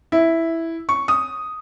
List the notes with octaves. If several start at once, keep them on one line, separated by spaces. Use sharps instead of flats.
E4
C#6
D#6